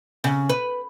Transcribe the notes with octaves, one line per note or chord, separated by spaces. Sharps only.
C#3
B4